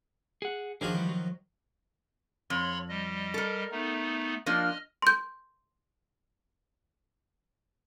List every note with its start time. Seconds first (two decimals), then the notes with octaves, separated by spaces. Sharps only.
0.42 G#4 F#5
0.81 D#3 F3 D4 F#4 G#4 C#5
0.95 E3 G3
1.09 F#3
2.50 F2 C#5 B5 C6
2.89 G3 D#5
3.34 A4 A#4
3.71 A3 B3 D#4
4.46 F3 A#3 D4 D#5 F6
5.02 C6 G6